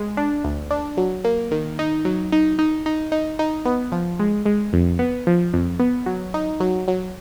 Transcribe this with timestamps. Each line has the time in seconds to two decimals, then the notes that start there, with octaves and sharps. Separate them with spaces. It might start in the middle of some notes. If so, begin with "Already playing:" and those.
Already playing: G#3
0.17 D4
0.44 D2
0.71 D4
0.97 F#3
1.24 A#3
1.51 D#3
1.79 D#4
2.05 F#3
2.32 D#4
2.59 D#4
2.86 D#4
3.12 D#4
3.39 D#4
3.65 B3
3.92 F3
4.19 G#3
4.46 G#3
4.73 F2
4.99 B3
5.27 F3
5.54 F2
5.80 B3
6.06 F#3
6.34 D#4
6.60 F#3
6.88 F#3